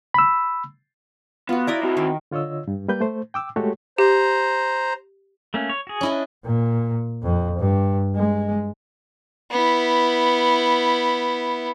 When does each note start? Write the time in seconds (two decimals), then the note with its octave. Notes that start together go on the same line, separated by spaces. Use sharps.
0.14 B5 E6
1.49 B3 F4 F#4
1.67 E4 A#4 D5 D#5
1.83 C4 F#4
1.97 D#3
2.31 D3 F4 C#5 D#5 E6
2.68 G2
2.88 G3 A#3 B4 G6
3.01 A3 C5
3.34 G5 D6 E6
3.56 G#3 A3 F#4 G4 A4 C#5
3.98 G4 C5 A#5
5.54 A3 A#3 C#4
5.69 C#5
5.87 F#4 G#4
6.01 C#4 E4 D#5
6.12 D4
6.44 A#2
7.22 F2
7.59 G2
8.16 G#3
9.51 B3 E4